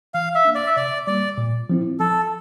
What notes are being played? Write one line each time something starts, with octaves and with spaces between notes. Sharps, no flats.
E3 F5
E5
A#3 D4
D5
E5
C3 D5
G3 A#3 D5
A#2
F3 C4 E4
F3 A4